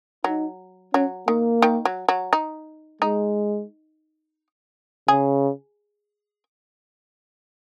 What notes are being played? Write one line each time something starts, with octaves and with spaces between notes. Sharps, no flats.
F#3 D#4
F#3 C#4
D#3 A#3
D#3
F#3
F#3
D#4
G#3 D#4
C#3 G#4